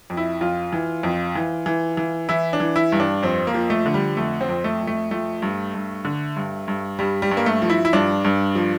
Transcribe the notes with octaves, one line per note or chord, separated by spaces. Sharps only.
F2
E4
F2 F4
E3
F2
E3
E3
E3
E3 E4
D4
E3
E4
G2
D4
F2 C4
A#3
F3
A3
D3
G3
F2 A3
C4
F2
A3
F2
A3
F3 A3
G2
G2
D3
G2
G2
G2 G3
G3
G2
A#3
A3
F3
E4
E4
G2 D4
G2
F3